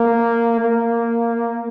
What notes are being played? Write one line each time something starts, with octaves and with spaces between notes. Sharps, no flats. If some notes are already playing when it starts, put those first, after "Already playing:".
Already playing: A#3
A#3